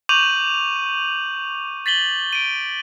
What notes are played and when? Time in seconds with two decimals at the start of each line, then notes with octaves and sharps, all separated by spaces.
0.09 C#6 D6 G6 D#7 F7 F#7
1.86 A6 B6 F#7 G7
2.33 D7 D#7